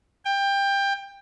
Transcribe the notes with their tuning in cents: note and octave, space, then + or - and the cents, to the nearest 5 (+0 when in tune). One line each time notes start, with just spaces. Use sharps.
G5 +20